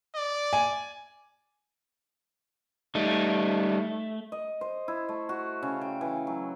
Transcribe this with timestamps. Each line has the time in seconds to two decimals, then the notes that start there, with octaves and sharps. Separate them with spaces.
0.16 D5
0.53 G#5
2.95 G3 A3 D#4
4.32 D#5
4.61 C5
4.88 E4
5.09 A3
5.29 F#4
5.62 C#3
5.81 G5
6.01 E3
6.27 F#3